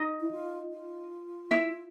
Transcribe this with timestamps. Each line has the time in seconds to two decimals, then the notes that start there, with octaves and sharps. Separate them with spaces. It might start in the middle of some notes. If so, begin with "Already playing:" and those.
Already playing: D#4 D#5
0.21 E4
0.31 F4
0.71 F4
1.51 E4 E5